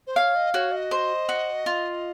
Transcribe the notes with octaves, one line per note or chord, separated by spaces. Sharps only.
C5
C#5 F5
D#5
F#4 C#5
D#5
C5
F#4
F4